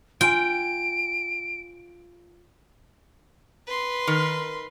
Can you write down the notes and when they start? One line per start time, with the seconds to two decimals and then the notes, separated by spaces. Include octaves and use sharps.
0.21 F4 G5 G#5 D7
3.67 B4 C6
4.07 D#3 A#4